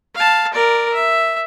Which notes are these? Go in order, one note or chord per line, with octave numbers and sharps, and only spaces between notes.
F5 A5
A#4 D5
E5